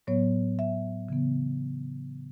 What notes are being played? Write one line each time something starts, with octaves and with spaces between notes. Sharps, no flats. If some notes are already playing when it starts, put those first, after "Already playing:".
A2 F#3 B3 C#5
E5
C#3 E3 B3